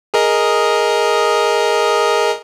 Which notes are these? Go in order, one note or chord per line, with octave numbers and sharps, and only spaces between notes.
G#4 A#4 D#5